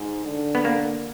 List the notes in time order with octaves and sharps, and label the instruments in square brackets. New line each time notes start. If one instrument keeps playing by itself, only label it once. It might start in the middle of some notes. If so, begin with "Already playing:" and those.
Already playing: [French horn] G#2
D3
[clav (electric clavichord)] B3
A#3